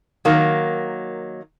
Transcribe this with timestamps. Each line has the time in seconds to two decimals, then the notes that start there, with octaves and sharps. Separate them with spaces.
0.25 D#3 F#3 A#3